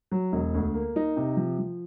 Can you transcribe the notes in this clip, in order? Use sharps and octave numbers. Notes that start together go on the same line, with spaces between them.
F#3
E1
D2
A#3
D#4
C3
F3
F3